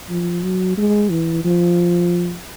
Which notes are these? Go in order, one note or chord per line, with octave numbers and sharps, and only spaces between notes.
F3
F#3
G#3
E3
F3